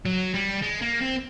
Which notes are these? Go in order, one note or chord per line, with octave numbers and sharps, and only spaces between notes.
F#3
G3
G#3
A#3
C4